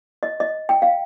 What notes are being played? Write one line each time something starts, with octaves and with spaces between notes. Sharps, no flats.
D#5
D#5
G5
F5